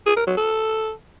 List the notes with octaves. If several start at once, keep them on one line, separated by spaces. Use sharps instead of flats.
G#4
A#4
F#3
A4